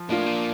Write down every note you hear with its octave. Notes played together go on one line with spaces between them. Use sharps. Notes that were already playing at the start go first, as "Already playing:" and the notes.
Already playing: F3
A2 A#3 D4 F4
A#2 F3